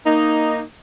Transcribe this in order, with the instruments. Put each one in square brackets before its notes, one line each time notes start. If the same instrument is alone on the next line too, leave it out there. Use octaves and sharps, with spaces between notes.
[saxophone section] A#3 D#4